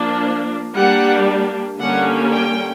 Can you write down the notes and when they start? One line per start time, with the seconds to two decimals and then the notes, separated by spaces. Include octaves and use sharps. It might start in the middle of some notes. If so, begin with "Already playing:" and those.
Already playing: F3 A#3 D4
0.75 G3 A#3 D4 F#5
1.79 D3 G3 A#3 C#4 F#5
2.31 G5